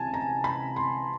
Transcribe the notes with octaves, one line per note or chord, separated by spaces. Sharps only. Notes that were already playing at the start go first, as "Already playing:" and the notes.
Already playing: C#2 C3 E3 G#5 A5
A#5
B5
C6